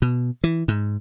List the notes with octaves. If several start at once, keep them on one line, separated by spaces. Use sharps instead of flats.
B2
E3
G#2